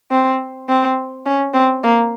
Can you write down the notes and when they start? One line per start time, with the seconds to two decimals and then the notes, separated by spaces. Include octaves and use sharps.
0.11 C4
0.69 C4
1.26 C#4
1.54 C4
1.83 A#3